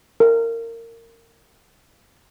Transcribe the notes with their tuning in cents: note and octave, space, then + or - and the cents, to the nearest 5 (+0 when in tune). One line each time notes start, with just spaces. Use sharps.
A#4 -20